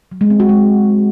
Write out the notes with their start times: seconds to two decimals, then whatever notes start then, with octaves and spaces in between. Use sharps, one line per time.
0.12 F#3
0.21 G#3
0.30 C4
0.40 F#4
0.49 G#3